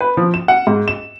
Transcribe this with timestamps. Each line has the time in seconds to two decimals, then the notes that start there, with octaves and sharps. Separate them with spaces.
0.01 B4
0.17 F3
0.34 E7
0.48 F#5
0.67 G#2
0.88 E7